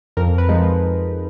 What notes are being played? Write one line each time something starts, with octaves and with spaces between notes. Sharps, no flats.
F2 A#4
B4
F3 G#3 D#4